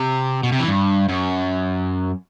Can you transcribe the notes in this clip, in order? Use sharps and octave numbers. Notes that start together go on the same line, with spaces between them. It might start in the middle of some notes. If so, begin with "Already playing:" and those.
Already playing: C3
B2
C3
E3
G2
F#2